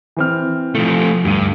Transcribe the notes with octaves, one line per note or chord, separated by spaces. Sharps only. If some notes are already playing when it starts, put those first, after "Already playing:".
E3 C4 F6
F3 A3
D2 G2 D#7